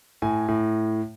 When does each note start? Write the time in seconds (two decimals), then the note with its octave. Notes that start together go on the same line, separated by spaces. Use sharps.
0.22 A2 G#5
0.48 A2